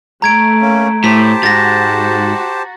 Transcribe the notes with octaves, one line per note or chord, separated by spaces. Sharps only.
A3 A#5 G#6 D7
A#3 C#4
A2 G4 C5 A5 B6
G#2 F#4 A6 A#6